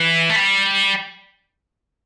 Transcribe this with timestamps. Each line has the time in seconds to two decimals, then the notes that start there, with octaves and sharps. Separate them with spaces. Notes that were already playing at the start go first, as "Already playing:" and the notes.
Already playing: E3
0.30 A3
0.36 G3